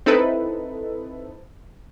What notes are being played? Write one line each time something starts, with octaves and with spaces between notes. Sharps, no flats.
C4 D#4 E4 A4 B4